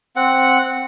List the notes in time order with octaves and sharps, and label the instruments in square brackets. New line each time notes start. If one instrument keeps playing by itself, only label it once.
[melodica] C4 F#5